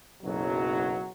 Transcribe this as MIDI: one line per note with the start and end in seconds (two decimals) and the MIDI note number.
0.23 1.08 30
0.23 1.08 35
0.23 1.08 54